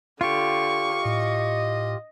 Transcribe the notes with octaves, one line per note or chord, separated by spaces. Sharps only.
D3 F4 G4 C#6
A2 D#5